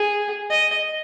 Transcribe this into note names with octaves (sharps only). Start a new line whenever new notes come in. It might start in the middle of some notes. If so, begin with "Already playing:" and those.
Already playing: G#4
D#5